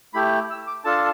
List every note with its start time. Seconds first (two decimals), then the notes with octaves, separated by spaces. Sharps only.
0.14 A3 E4 G4 B5
0.50 E6
0.67 D6
0.84 D4 F4 A4 A5